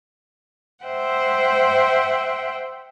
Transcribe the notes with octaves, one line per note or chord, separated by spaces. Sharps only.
C5 E5 F#5 G5